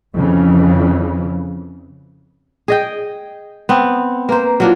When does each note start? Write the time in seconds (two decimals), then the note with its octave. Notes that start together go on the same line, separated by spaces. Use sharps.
0.14 F2 C#3 E3
2.68 G#4 D#5 G5
3.69 B3 C4
4.29 A#3 B4 C5 A#5
4.60 F#3 A#3 D4 E4 F4